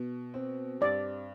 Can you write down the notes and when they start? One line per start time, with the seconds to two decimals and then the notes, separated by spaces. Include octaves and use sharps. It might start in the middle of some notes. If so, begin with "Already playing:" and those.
Already playing: B2
0.34 C4
0.81 G2 D5